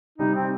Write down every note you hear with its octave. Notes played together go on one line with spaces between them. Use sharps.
C3 G3 D4 D#4 G4
C4